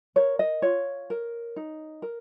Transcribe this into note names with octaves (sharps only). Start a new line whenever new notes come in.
A#4 C#5
D#5
F4 C#5
A#4
D#4
A#4